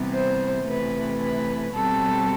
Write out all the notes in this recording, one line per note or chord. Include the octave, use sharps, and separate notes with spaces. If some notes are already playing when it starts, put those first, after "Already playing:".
Already playing: C3 E3 G3 B3
C5
C3 E3 A3 B4
B4
B2 G3 C4 A4